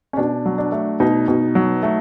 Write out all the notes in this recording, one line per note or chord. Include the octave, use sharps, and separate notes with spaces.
C#4
B2 D4
F#3
D4
A3
B2 D#4
B2
F#3
A3